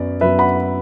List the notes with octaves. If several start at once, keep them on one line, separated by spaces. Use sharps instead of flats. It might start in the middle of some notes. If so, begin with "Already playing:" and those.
Already playing: F#2 F#3 B3 D5
F#2 F#3 B3 B4 E5
F#5 B5